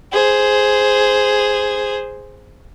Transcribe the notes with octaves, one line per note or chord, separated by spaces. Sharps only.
G#4 C5